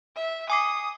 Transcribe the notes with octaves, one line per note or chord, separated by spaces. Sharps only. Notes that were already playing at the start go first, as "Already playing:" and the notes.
E5
G#5 D6 D#6 C7